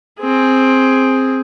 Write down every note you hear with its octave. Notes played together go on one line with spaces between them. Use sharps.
C4 G#4